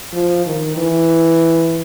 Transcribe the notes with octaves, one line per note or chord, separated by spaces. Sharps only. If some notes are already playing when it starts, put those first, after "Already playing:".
F3
D#3
E3